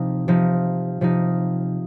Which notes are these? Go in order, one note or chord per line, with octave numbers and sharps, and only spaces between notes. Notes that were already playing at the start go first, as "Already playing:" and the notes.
Already playing: C3 F3 D#4
C3 F3 D#4
C3 F3 D#4